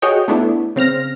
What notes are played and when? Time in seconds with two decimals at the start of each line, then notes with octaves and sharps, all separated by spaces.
0.02 F#4 G#4 C#5 D#5 G5
0.28 A3 B3 D4 E4
0.76 C#3 C4 F6 A#6